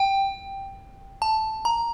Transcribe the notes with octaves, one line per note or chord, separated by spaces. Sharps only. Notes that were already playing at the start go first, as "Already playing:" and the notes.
Already playing: G5
A5
A#5